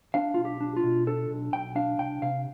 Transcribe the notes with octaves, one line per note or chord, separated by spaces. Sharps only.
D4 F5
B1 F4
G4
D4
F4
B2
D4 A4
B1
B1 G5
D4 F5
C2 G5
C3 F5